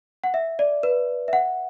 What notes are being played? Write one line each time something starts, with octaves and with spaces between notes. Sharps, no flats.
F#5
E5
D5
B4
E5
F#5